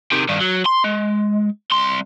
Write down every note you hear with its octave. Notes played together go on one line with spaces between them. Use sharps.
C3 D#3
G2 D#3
F#3
C6
G#3
C2 C6